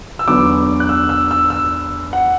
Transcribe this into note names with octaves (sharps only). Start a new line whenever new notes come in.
E6
E2 D3 F#3 B3 D6
F#6
E6
E6
E6
E6
F#5